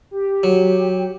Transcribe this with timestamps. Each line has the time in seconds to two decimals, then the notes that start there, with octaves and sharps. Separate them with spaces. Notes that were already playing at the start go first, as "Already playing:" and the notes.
0.11 G4
0.43 F#3